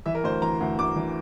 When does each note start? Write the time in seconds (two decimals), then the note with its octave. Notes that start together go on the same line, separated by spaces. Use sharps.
0.06 E3 E5
0.15 A#4
0.24 D2 C5
0.42 E3 A#5
0.60 D2
0.78 D2 D6
0.96 E3